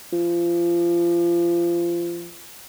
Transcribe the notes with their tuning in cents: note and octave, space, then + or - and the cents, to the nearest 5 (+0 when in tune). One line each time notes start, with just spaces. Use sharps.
F3 -25